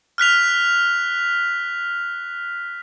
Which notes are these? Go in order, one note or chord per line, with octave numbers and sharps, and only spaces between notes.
F6 F#6 B6 F7